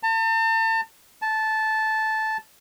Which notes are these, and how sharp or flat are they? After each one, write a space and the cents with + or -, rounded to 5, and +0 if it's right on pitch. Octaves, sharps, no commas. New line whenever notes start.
A5 +40
A5 -10